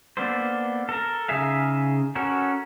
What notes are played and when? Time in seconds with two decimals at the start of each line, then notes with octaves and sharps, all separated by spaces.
0.17 A#3 B3 D4 A4 C5
0.89 A4 A#4
1.28 C#3 D#4 G#4 E5 F5
2.15 C#4 F#4 A4 A#4